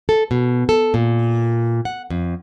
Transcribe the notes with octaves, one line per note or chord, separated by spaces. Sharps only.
A4
B2
A4
A#2
F#5
F2